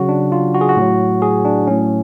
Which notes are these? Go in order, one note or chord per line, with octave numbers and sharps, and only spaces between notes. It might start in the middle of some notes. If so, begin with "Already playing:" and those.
Already playing: C#3 F#3 F#4
D4
F4
F#4
G#4
F#4
A2
F#3
G#4
D4
A2 F#3 C#4